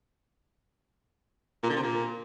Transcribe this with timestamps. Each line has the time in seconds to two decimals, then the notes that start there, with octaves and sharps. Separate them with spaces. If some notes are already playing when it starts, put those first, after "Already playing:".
1.63 A#2
1.70 D3
1.76 C3
1.83 A#2